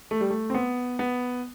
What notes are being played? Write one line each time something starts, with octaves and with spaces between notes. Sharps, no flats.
A3
G3
A3
C4
B3
B3